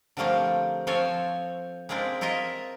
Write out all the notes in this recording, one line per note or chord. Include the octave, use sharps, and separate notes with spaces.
D3 F3 G3 A3 A#3 C4
F3 C4 A4 C#5 G#5
G#3 A#3 C4 D4 E4
E4 F4 A#4 D#5 E5